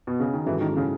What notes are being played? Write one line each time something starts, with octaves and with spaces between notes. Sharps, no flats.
B2
C#3
D#3
G#2 E3 F#3 C#4 E4 A4
D#3
C#3